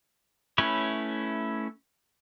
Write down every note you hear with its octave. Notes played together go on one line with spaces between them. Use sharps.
A3 C#4 E4 B4 C#5